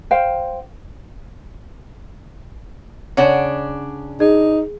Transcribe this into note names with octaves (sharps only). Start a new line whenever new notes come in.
C5 F5 G5
C#3 D4 C#5 F#5
D#4 G#4